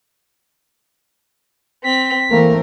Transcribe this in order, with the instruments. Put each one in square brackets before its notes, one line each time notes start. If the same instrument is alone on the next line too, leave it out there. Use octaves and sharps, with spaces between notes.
[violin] C4 [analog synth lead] B6
[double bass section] E3 A3 C4 [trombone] A#3 [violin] A#4